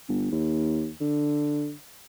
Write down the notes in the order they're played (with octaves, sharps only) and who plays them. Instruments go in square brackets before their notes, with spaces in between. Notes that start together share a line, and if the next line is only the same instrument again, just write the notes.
[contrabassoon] G1
D#2
D3